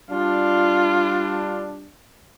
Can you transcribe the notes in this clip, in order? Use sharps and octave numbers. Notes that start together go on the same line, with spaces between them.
G3 D4 F4